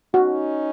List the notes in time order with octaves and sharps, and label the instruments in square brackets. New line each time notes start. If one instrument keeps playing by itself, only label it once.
[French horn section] C#4 D#4 [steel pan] F#4